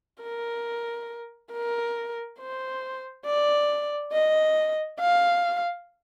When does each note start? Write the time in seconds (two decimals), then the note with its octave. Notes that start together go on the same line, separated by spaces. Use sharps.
0.23 A#4
1.53 A#4
2.40 C5
3.26 D5
4.13 D#5
5.00 F5